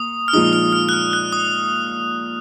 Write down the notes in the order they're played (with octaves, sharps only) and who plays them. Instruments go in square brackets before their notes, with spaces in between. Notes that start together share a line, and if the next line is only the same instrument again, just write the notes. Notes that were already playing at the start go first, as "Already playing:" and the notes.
Already playing: [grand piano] A#3 [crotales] D#6
[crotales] F6
[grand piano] A#2 F3 G#3 D#4 [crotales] D#6
[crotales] F6
F6
F#6
F6
F#6
D#6